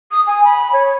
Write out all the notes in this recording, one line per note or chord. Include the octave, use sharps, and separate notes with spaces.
D#6
G#5
B5
C#5